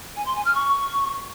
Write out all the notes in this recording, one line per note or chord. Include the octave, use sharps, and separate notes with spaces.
G#5
C6
G#5
F6
C#6